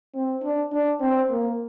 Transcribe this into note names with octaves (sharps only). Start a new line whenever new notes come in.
C4
D4
D4
C4
A#3